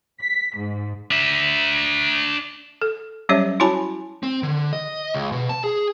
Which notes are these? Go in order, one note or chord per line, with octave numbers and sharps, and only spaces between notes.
B6
G#2
D4 E5
A4
F#3 G3 C#4 G4 C#5 E5
E4 F#4 C#5 G#5 A5 B5
C4
D3
D#5
C#2
B2
A5
G#4